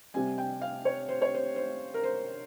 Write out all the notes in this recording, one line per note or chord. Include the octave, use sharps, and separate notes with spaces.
C3 G3 C4 G#5
G5
F5
C#5
C5
C#5
C5
C5
A#4
C5